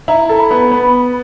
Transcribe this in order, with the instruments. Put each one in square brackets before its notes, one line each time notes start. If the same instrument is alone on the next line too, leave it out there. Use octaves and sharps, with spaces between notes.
[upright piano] E4 [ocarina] A#5
[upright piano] A4 [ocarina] A#5
[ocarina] B5
[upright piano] B3
[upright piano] B3 [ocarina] B5